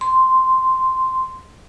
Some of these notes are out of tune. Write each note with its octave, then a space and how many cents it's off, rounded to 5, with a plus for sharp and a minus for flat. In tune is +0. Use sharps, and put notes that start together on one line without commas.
C6 -5